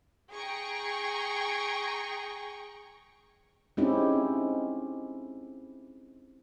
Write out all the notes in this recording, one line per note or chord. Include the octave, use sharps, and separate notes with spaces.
G#4 G5 A#5 C#6
G#3 C4 C#4 D#4 E4 G4